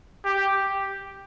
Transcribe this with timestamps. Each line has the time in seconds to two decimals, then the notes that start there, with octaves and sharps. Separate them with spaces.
0.25 G4